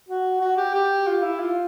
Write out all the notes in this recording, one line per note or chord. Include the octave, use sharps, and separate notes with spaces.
F#4
F#4
G4
G4
F4
E4
F4